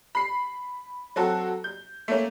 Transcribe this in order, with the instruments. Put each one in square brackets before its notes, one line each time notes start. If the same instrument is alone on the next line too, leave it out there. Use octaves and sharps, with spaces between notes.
[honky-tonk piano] B5 C7
F#3 C4 F#4 A4
G6
A3 A#3 C#4